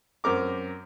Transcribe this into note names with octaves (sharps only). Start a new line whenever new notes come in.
F#2 C4 A#4 D6